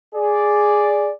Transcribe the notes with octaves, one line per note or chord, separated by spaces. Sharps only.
G#4 D5